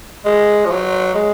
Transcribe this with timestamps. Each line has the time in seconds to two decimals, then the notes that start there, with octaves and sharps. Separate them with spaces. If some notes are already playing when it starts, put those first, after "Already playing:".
0.25 G#3
0.65 F3
0.70 F#3
1.14 G#3